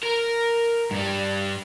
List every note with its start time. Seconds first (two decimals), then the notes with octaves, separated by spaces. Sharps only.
0.03 A#4
0.91 G2 G3